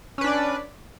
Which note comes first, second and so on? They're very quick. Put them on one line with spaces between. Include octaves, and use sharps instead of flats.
C#4 B4 D4 D5